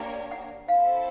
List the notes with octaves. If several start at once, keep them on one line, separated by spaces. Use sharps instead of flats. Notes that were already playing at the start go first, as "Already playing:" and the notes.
Already playing: A#3 D4 G4 A#4 C#5
F#5
C4 E4 A4 C5 F5